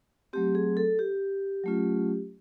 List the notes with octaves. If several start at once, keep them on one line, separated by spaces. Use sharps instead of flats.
F#3 A3 C4 G4
G#4
A4
G4
F#3 A3 C#4 F4